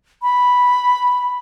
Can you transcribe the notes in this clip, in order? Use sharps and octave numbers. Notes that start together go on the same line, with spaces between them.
B5